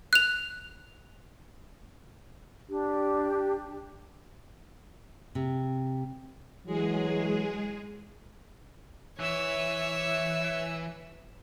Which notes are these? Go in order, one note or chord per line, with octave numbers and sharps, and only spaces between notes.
F#6 F7
D4 G4
C3
E3 F#3 G#3 G#4
E3 C#5 E5 E6